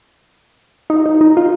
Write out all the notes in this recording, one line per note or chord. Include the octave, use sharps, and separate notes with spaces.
D#4
D#4
D#4
F4